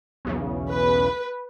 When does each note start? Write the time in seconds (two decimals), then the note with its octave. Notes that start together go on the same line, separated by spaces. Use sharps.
0.25 B1 E2 C#3
0.72 B4